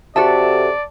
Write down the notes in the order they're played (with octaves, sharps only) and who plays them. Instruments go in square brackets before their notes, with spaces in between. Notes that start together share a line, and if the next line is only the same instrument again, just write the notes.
[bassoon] C3 [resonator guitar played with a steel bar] F#4 A4 E5 [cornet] D5 [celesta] A5